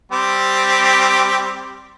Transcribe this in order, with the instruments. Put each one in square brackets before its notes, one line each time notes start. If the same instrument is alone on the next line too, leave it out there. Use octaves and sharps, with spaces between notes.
[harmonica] G3 C4 G4